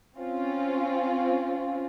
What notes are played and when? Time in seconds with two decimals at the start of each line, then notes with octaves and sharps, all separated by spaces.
0.18 C4 C#4 F4